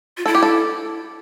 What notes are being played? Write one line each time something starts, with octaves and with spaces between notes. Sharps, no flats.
F4
E4 A4
G4
A4